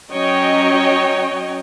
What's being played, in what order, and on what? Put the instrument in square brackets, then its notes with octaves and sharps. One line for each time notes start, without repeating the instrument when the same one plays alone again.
[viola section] F#3 C#4 C#5 D#5 G5